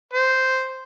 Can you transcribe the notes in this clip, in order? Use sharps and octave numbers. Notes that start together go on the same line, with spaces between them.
C5